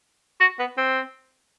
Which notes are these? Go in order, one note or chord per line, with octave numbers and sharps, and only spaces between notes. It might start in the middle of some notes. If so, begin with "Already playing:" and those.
F#4
B3
C4